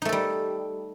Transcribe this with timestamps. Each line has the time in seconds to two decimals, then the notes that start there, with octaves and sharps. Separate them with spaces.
0.02 D#4
0.05 A3
0.09 A4
0.13 G3